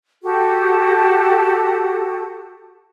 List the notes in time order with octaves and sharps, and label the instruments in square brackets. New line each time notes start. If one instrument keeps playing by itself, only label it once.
[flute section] F#4 G4 A4